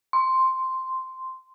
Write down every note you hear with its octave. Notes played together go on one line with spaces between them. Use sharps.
C6